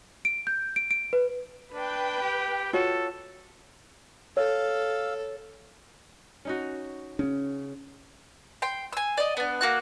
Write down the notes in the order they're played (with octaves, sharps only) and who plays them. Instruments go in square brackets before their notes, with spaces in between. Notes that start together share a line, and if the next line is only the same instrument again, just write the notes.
[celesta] D7
G6
D7
D7
B4
[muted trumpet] D4 [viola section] B4 G5
[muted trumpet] G4
[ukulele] F4 F#4 C#5 [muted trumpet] A4
[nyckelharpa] A4 [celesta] C#5 [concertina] F5 E6
[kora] C#4 D#4 F#4
[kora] C#3 [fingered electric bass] C#4 D4
[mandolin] G5 C6
G#5 E6
D5 D#5
B3 D4
A#3 F#4 F#6